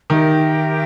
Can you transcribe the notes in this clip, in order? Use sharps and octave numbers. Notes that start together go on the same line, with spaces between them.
D#3 G4 A#4 E5 G5